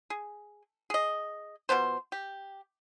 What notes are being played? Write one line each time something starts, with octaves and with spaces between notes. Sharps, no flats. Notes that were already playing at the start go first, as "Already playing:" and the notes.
G#4
G#4 D#5
B2 F3 B3 C5
G4